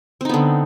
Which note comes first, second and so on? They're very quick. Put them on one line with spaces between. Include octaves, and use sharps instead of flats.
C4 D#4 B3 D3